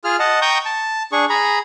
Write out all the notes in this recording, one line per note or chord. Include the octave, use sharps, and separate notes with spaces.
F4 G#4 F6
D#5 F#5 A5
G5 A#5 C#6 D#6 G6
A5
D4 G#4 C#6
G#4 A#5 B5